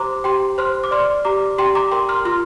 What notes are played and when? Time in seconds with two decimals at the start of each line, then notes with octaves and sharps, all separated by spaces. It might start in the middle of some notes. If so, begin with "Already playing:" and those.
Already playing: G4 C5 A#5 C6 D6
0.24 G4 G5 C6
0.58 C5 C6 F6
0.84 D6
0.91 D5 C6 F6
1.25 G4 A#5 D6
1.58 G4 G5 C6
1.75 A#5 D6
1.91 A#4 G5 C6
2.09 C6 F6
2.25 F4 C6 F6